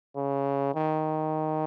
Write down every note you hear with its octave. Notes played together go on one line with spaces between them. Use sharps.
C#3
D#3